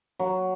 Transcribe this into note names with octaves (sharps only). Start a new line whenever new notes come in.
F#3